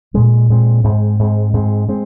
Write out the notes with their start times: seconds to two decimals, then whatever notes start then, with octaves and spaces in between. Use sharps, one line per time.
0.14 A#2 G#3 C4
0.49 A#2 G#3 C4
0.84 G#2 G#3 C4
1.19 G#2 G#3 C4
1.53 G#2 G#3 C4
1.89 G#3 C4